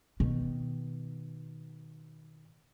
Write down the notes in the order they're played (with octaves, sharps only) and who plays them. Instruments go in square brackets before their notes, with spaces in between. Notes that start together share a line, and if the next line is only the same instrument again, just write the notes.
[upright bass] B2 D#3